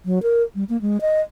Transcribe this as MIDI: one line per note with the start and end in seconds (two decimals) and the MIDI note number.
0.05 0.22 54
0.23 0.43 70
0.55 0.64 55
0.69 0.80 58
0.81 1.01 56
1.01 1.21 75